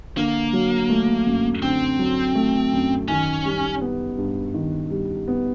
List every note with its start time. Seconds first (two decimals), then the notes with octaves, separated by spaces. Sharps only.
0.17 D3 A#3
0.53 F#3
0.90 A3
1.26 F#2
1.62 D3 C4
1.99 F#3
2.35 A3
2.73 F#2
3.08 D#3 C#4
3.45 G3
3.81 B3
4.17 G2
4.54 D#3
4.91 G3
5.28 B3